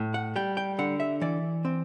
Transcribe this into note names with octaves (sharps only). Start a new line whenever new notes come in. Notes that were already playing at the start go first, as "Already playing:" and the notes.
Already playing: A2
F#5
G3 G5
G5
D3 F#5
E5
E3 D5
C4